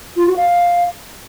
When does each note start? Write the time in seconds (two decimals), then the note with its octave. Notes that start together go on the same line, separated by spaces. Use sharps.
0.16 F4
0.26 F#4
0.36 F5